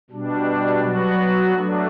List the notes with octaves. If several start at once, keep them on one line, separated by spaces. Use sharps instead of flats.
B2 G3 D4
F#3 B3 F#4
F#3 A3 D4